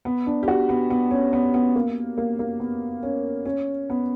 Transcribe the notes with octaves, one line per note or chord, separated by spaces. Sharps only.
B3
D4
G4
F#4
B3
B3
C#4
B3
B3
A#3
A#3
A#3
B3
C#4
C#4
B3